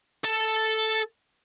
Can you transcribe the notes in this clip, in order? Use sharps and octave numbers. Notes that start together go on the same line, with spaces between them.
A4 A5